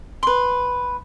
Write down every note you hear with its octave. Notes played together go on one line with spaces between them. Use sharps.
B4 C6